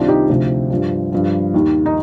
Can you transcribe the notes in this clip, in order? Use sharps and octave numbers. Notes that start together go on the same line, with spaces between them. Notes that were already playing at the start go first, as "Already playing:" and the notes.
Already playing: C2 C3 D#3 D4 F4
D#4 G4
D2 C3 F3
G2 F3
G2 F3
D#2 D#3
D#4